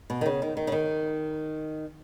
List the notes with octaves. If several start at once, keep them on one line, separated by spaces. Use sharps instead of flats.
B2
D#3
C#3
D#3
D#3
C#3
D#3